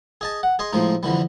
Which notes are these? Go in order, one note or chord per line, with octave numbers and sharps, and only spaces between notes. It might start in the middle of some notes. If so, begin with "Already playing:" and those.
G#4 D#5 A5
F#5
G#4 D#5 C6
A2 F3 G#3 D#4
F2 D3 E3 G3